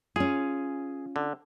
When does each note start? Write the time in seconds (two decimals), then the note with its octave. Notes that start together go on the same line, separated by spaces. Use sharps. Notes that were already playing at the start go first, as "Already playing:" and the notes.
0.16 C#4 F4 G#4
1.16 D3